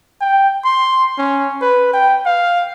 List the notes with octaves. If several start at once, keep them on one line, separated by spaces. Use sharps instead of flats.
G5
C6
C#4
B4
G5
F5